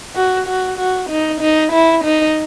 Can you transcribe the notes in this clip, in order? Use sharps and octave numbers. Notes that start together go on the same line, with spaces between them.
F#4
F#4
F#4
D#4
D#4
E4
D#4